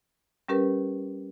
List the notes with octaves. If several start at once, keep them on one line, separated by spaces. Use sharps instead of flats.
G3 C#4 G4 A#4 B4